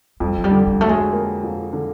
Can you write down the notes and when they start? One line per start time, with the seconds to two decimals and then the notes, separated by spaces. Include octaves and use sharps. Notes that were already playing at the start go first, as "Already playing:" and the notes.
0.20 F2 G3
0.37 F#3
0.44 G3
0.51 D3
0.67 G3
0.81 F#3 A3
0.89 G#3
1.13 A#3
1.44 F2
1.73 D3